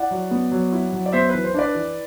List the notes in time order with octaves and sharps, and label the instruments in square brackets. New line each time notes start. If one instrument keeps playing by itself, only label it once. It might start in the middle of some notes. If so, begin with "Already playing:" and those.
Already playing: [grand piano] E4 D5 F#5
F#3
B3
F#3
E4
F#3
D5
B3 C5 E5
E3 B4
C5
D4 B4 D5
E3